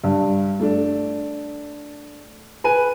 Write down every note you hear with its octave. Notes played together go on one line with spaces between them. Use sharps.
G2
A3 D4
B4 G#5 D#7